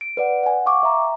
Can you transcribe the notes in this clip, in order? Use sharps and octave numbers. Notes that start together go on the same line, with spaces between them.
D7
B4 D5 F#5
F#5 G#5
F5 C#6 D6
E5 A#5
G5